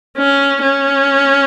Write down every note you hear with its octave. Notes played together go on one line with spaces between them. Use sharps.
C#4
C#4